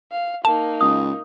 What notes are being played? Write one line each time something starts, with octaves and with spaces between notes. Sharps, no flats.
F5
A#3 D#4 A5
C#2 D#6